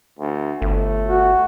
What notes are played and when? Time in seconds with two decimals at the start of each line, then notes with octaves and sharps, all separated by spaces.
0.19 D2
0.62 G1 A3
1.07 F#4